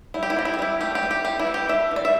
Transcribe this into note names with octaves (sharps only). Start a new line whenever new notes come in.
G3 E4
G4
E4
C4 G4
E4
G4
G3 E4
A3 G4
G4
E3
G4
E3 G4
E4
E3
G4
A3 E5
E3 D5
E5